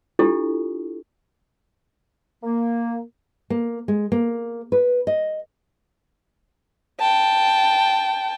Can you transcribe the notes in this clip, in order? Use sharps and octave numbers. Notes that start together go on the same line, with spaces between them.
D4 E4 F4 G4 A4
A#3
A#3
G#3
A#3
B4
D#5
G5 A5